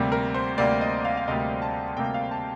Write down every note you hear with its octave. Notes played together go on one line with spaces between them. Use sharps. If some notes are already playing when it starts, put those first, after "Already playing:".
Already playing: D2 C3 G3 A#3
A#4
C5
D2 C3 G3 A#3 D5
D#5
F5
F5
D2 C3 G3 A#3 D#5
A5
D2 C3 G3 A#3 G5
F5
A5